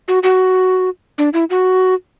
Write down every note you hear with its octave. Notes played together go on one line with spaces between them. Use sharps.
F#4
F#4
D4
E4
F#4